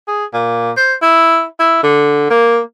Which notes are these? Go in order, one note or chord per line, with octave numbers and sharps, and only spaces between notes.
G#4
A#2
C5
E4
E4
D3
A#3